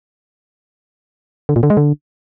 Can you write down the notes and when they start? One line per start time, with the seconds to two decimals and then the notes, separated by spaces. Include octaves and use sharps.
1.49 D3
1.56 A#2
1.63 D3
1.70 G#3
1.77 D3